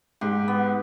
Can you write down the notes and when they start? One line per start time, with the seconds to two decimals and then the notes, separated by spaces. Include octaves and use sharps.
0.21 G#2 G4
0.48 B3